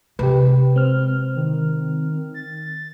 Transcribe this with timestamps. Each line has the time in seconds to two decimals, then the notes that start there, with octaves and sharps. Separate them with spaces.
0.19 C3 G#3 G4 B4
0.76 C4 F6
1.36 D#3
2.34 A6